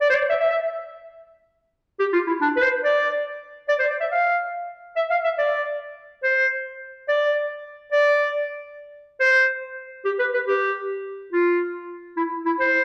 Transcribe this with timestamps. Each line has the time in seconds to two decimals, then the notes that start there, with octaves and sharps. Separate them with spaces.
0.01 D5
0.10 C5
0.15 D5
0.30 E5
0.40 E5
0.51 E5
1.99 G4
2.13 F4
2.27 E4
2.41 D4
2.57 B4
2.62 C5
2.84 D5
3.69 D5
3.79 C5
3.90 D5
4.01 E5
4.11 F5
4.96 E5
5.10 F5
5.25 E5
5.39 D5
6.23 C5
7.09 D5
7.93 D5
9.20 C5
10.05 G4
10.19 B4
10.34 B4
10.48 G4
11.33 F4
12.17 E4
12.46 E4
12.60 C5